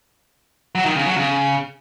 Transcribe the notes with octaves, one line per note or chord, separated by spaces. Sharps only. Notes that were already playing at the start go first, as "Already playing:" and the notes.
F#3
D#3
C#3
F#3
C#3